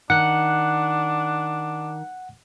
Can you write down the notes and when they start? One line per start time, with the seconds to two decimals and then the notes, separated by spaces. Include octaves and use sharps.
0.10 D#3 D4 F#5 F#6